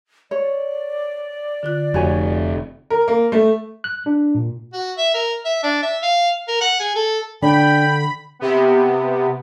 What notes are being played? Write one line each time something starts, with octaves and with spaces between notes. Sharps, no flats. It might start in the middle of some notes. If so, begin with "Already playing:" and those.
C#5 D5
D3 F4 F#6
F1 F#4 C#5 G#5
A#4
A#3
A3
F#6
D4
A#2
F#4
E5
A#4
E5
D4
E5
F5
A#4
F#5
G#4
A4
D3 D4 G5 B5
C3 B3